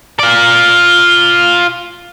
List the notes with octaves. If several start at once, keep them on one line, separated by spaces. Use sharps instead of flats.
F4 D5